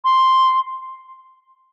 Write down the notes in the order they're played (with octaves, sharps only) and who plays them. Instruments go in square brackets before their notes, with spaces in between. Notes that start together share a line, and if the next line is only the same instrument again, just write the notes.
[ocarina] C6